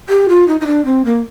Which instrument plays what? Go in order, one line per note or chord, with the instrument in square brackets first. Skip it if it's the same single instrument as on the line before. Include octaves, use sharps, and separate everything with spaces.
[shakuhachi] G4
F4
D#4
D#4
D4
C4
A#3